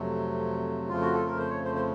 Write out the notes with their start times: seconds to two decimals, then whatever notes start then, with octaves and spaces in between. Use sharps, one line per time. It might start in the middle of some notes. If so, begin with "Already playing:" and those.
Already playing: F2 C3 F#3 A3
0.89 F2 C#3 F3 A3 F4
1.01 F#4
1.13 A4
1.26 A#4
1.38 C5
1.49 C#5
1.65 C5
1.75 C5